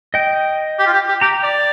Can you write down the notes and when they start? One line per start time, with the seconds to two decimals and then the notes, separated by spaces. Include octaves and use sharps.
0.14 D#5 G5
0.79 G4
0.86 F4
0.94 G4
1.08 G4
1.21 G4 G5 A#5
1.43 D5